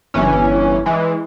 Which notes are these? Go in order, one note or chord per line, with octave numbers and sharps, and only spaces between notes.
G1 E3 C#4
E3 G#3